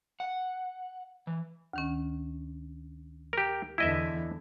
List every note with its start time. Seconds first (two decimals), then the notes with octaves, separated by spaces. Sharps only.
0.20 F#5
1.27 E3
1.73 D2 D#3 C#4
3.33 G4 A#4
3.78 E2 D3 E3 E4 D#5 E5